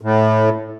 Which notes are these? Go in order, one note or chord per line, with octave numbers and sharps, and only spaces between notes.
A2